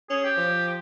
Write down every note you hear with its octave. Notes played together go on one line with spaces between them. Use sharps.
C#4 G#4
G4
F3